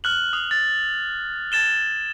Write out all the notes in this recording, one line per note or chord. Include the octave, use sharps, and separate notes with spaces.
F6 F#6 F#7
D#6
A6
G#6 A6 E7 G7